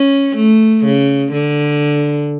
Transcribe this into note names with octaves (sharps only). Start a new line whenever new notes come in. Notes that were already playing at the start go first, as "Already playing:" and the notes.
Already playing: C#4
A3
C#3
D3